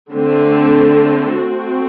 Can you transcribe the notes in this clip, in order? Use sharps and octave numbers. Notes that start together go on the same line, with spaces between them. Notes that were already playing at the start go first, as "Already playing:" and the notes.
D3 A3 C4
A3 C4 F#4